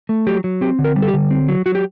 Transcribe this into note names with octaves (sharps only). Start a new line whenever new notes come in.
A3
F#3 G4
F#3
C4 G4
D3
A#4
G3
A4
G4
D3
C4
F#3
F#3 F#4
G4